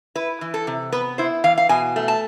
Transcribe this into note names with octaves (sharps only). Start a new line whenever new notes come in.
E4 B4
E3
A4
C3
B3 B4
E4 C5
E3 F5
F5
B2 G#5
A3
A5